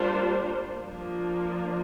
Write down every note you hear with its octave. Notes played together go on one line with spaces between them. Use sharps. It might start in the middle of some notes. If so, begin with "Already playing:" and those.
Already playing: G3 A#3 D4 F4 C5
F3 A#3 D4 F4